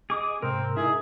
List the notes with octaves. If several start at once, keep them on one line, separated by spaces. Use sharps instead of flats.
G#4 D#5 D6 D#6
G#2 C3 C4 A#4
D#4 E4 G#4 A#4 E5